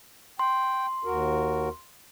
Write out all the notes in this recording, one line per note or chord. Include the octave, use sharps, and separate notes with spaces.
G5 C6
D#2 F#4 A#4